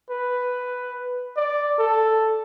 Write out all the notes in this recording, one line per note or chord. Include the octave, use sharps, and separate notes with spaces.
B4
D5
A4